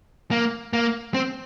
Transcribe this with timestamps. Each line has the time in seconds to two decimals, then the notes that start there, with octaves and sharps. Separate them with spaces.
0.31 A#3
0.73 A#3
1.14 C4